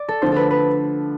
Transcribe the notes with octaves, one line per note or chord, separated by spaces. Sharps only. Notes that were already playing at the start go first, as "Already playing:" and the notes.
Already playing: D5
A4
D3 F3 A3 C5
A4 B4
B4